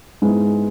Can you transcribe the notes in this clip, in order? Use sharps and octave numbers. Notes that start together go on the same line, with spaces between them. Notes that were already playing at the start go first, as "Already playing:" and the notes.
G#2 G#3 B3 E4